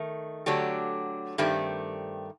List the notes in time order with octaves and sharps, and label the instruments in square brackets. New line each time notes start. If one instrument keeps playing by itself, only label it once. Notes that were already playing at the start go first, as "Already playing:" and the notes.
Already playing: [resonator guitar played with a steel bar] D#3 A3
D3 F#3 A3 D4 G4
G2 D#3 A3 C4 G4